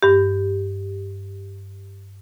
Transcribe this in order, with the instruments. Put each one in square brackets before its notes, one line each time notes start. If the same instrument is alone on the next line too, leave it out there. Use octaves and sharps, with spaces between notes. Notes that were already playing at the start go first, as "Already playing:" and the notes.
[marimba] G2 G4